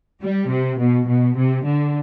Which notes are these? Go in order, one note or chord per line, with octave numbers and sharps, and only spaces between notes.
G3
C3
B2
B2
C3
D3